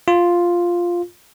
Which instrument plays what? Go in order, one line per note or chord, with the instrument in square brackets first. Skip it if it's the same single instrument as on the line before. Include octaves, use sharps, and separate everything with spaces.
[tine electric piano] F4